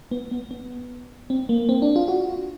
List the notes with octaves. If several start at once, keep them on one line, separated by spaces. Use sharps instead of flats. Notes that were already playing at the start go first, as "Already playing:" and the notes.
B3
B3
B3
C4
A#3
C4
D4
F4
F#4